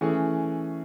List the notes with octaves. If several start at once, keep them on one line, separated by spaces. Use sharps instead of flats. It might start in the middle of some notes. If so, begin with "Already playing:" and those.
E3 A3 C#4 G#4